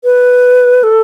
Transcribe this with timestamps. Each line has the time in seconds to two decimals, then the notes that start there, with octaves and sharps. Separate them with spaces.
0.04 B4
0.83 A4